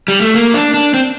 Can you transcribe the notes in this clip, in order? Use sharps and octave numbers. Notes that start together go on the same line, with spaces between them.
G3
A3
A#3
D4
D4
C4